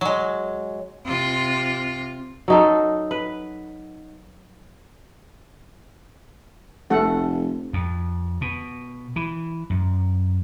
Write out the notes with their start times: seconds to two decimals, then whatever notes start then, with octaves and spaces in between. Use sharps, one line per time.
0.01 F#3 G#3
1.07 C3 F4
2.48 F#3 D#4 A4
3.11 B4
6.90 F1 A3 A4 F#5
7.73 F2
8.41 B2
9.16 E3
9.70 F#2